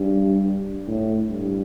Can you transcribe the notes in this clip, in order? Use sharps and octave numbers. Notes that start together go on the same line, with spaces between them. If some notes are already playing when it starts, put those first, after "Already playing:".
Already playing: G2
A2
G2